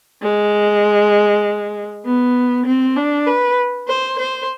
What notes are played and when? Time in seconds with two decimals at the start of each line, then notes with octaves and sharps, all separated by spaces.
0.22 G#3
2.05 B3
2.66 C4
2.96 D4
3.27 B4
3.88 C5
4.19 C5